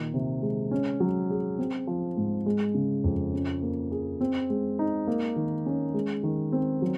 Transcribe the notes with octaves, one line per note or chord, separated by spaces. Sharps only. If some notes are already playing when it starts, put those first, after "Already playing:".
Already playing: A#2 D#3
C3
G#3
C#4
F#3
G#4
C4
F3
G#2
G#3
C#3
F2
C#4
A#3
G#4
C4
G#3
D#4
A#3
D#3
C#4
G#3
D#3
C4
F#3